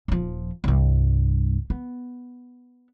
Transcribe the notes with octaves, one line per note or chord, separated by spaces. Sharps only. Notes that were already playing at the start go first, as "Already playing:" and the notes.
D#1 F3
C2 G2
B3